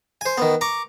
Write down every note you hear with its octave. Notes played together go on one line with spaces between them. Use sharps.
C5 G#5
D#3 B3
A#5 C#6 D6